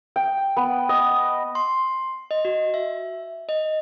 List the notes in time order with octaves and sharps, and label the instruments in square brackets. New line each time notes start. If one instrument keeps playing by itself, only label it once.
[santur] G5
B3
D#5
[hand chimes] C6
D#5
F#4
E5
D#5